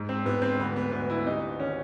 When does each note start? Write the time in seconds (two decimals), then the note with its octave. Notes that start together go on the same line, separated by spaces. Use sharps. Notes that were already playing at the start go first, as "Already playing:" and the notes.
Already playing: G#2
0.09 C4
0.25 G#2 B3
0.42 C4
0.59 D2 B3
0.76 B3
0.92 D2 B3
1.10 E4
1.26 C3 D#4
1.59 D#3 C#4